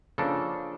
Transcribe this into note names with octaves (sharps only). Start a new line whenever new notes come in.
C#3 F3 A#3 D4 A4